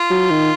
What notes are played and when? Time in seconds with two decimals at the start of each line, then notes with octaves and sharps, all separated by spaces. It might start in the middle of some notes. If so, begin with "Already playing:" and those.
Already playing: F4
0.10 F#3
0.30 D#3